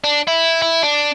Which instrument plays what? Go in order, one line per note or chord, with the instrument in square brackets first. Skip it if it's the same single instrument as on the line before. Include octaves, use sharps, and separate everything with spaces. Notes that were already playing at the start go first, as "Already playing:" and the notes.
[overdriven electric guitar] D4
E4
E4
D4